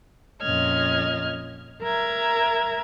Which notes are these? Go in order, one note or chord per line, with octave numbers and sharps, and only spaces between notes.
F2 A#2 C#4 D#5 F6 G#6
A#4 E5 A#5 G#6